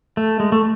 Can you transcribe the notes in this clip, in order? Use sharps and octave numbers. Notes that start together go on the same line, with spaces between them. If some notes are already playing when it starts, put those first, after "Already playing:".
A3
G#3
A3